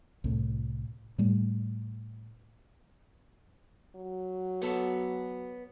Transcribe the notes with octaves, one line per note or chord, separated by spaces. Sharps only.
C2 A2
A2 G3 A3
F#3
B3 A4